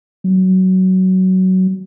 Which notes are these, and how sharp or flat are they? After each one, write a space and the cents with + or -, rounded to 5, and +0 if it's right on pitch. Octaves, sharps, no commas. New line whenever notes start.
F#3 +15